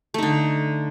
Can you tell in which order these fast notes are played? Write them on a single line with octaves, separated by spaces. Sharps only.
A3 D#4 D3